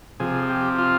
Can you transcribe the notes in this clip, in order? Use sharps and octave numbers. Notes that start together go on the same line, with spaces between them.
C3 F3 G#4
G4
F4